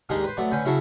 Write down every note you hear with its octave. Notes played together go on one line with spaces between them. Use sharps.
D#2 G#3 A#3 D4 D#4 G4
B4 C5
F#3 A3 B3 D5
D3 C#4 B4 G5
C#3 F#3 E4 F#4 A4